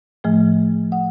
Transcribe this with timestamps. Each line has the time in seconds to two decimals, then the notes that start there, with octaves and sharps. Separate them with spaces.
0.24 A2 F3 A3
0.92 F#5